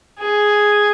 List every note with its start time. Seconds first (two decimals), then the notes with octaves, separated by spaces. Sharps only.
0.20 G#4